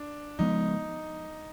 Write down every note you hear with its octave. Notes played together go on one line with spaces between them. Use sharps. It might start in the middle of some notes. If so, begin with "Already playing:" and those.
Already playing: D4
C#3 F3 G#3 B3 D#4